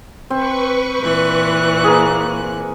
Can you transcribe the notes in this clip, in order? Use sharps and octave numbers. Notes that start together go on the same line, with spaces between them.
C4 B4 C#6
A#2 E3 F#6
A#3 G#4